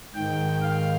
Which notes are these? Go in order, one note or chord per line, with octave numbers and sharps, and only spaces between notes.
G#2 D#3 G5
F5